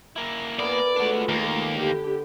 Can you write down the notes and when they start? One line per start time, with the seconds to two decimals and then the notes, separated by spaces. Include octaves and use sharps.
0.16 A#3 E4
0.59 B3 A#4 D5 G#5
0.96 G#3 A3 D4 F4 F#4
1.29 D#2 A#3
1.75 D3 G4